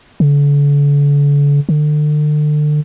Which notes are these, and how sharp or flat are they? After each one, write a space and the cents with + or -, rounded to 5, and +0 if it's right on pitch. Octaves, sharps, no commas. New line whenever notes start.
D3 -40
D3 +35